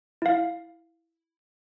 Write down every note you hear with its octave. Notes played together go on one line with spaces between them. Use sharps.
E4 F5